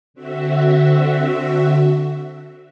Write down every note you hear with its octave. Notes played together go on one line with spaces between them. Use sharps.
D3 C4 F#4 E5